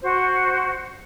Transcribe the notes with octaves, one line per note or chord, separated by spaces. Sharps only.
F#4 C5